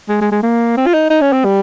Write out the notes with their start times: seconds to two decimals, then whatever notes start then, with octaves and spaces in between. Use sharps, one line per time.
0.09 G#3
0.21 G#3
0.31 G#3
0.43 A#3
0.77 C4
0.86 F4
0.94 D#4
1.10 D#4
1.21 C#4
1.32 C4
1.44 G3